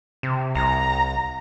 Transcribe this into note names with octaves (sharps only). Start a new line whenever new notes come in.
C3
C2 A#5